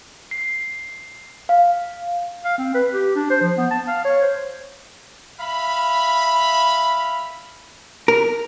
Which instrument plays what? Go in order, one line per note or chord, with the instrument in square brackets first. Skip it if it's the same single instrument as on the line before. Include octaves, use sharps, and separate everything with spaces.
[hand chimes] C7
F5
[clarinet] F5
C4
B4
G4
D4
C5
F3
B3
A5
F5
C#5
C5
[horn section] E5 F5 B5
[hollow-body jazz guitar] A#4